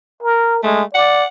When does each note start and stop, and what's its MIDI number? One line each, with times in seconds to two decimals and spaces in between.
0.23 0.63 70
0.63 0.83 56
0.63 0.82 57
0.95 1.24 74
0.95 1.27 78